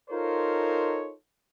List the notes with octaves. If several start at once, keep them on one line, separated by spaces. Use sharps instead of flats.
D#4 F4 A4 A#4 C5 C#5